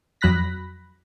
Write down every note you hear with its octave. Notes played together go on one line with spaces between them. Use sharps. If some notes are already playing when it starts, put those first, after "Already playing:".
F2 F#3 B5 F#6 A#6 B6